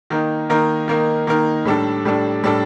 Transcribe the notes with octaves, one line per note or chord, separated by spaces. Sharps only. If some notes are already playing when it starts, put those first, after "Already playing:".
D#3 A#3 D#4 A#4
D#3 A#3 D#4 A#4
D#3 A#3 D#4 A#4
D#3 A#3 D#4 A#4
A2 G3 D4 A4
A2 G3 D4 A4
A2 G3 D4 A4